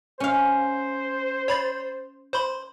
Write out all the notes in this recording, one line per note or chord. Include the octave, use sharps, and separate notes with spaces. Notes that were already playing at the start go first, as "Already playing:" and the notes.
C#4 C5 F5
C#5 B5 A6
C5 B5 C6